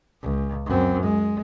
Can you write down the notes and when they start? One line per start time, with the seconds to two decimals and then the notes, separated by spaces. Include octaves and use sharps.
0.23 C#2
0.67 F#2 C4
1.02 G#3